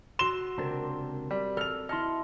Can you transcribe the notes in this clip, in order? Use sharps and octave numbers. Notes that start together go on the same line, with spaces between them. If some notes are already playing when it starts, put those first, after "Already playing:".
F#4 C6 E6 E7 G7
C#2 C3 C4 D4 A#4
G3
A4 F6 F7
E4 D#5 A5 C6 F6 C#7